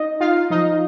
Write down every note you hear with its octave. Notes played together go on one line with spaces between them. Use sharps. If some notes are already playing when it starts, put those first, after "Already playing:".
Already playing: D#4 D#5
D#4 F4 F5
F3 D#4 D#5